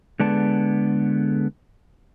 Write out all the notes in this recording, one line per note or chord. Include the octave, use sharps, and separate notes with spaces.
D3 G#3 B3 D5 A5